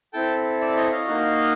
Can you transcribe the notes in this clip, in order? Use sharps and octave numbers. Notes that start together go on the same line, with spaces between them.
C4 E4 A4 G5 A5
D5 E5
C#5 D#5
D#5 F5
A#3 D#4 F#4